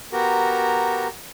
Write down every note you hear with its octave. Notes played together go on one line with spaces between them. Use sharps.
B3 F#4 G4 A#4 A#5